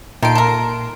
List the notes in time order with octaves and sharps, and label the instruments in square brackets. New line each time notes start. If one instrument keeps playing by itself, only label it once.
[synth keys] A#2 C6 D7 [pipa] D#3 A3
[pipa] A4 A#4